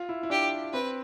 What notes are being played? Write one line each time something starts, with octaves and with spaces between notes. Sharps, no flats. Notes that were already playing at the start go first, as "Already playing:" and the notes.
Already playing: F4
E4
E4
D4 G4
C4 B4